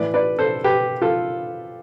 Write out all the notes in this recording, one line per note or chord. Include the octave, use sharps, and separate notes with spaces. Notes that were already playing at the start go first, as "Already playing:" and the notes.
Already playing: A2 E3 B4 D5
B4 D5
A4 C5
G4 B4
F4 A4